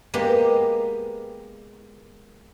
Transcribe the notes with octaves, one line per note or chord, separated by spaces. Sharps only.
G#3 A#3 B3 G4